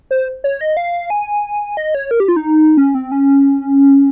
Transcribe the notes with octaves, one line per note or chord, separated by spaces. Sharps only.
C5
C#5
D#5
F5
G#5
D#5
C#5
A#4
G4
F4
D#4
C#4
C4
C#4